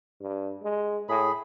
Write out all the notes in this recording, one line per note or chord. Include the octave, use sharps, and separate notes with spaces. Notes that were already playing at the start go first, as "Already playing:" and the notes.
G2
G#3
A2 G#4 B5